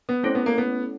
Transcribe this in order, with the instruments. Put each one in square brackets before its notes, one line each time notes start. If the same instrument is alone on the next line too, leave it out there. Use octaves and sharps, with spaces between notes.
[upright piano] B3
[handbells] A3 C#4 E4 A4 C#5 [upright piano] C4
[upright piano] B3
A#3
B3